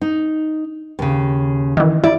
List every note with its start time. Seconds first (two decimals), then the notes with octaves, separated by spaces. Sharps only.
0.01 D#4
0.99 D#2 C#3
1.77 D#3 E3
2.04 E4 D5